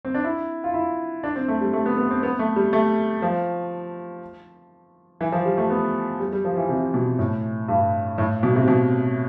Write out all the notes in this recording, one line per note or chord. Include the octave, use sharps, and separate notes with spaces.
C4
D4
E4
F4
E4
D4
C4
A3
G3
A3
B3
B3
C4
B3
A3
G3
A3
F3
E3
F3
G3
A3
B3
G3
G3
F3
E3
C3
B2
A2
G2
A2
B2
C3
B2